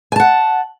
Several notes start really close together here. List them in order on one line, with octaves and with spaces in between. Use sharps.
G#5 A5 F#5